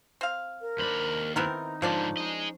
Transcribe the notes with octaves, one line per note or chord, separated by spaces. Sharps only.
C4 F5
A#4
D#2 D4 C5 B5
D#3 B3 C4 D#4 E4 A#4
G#2 D3 F3 A#3 C#4 D4 D5
G#4 D#5